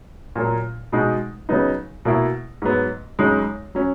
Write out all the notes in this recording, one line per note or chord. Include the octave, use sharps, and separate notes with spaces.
A#2 F#3 A#3
B2 G#3 D#4
C#3 F#3 B3 D#4
B2 A#3 E4
G#2 F#3 B3
F#2 C#3 G#3 D#4
F#3 C#4